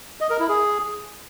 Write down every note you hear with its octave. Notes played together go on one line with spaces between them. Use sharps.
D#5
A#4
E4
G#4